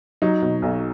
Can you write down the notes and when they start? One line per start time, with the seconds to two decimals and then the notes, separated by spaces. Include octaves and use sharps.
0.22 F#3 D#4
0.42 B2
0.62 B1